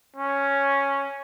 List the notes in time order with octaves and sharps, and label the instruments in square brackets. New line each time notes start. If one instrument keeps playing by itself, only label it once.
[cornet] C#4